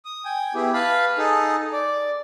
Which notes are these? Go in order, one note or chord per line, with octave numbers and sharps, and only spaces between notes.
D#6
G5 G#5
B3 E4 G4 G#4
B4 F5 A5 B5
D#4 G#4 A4
D5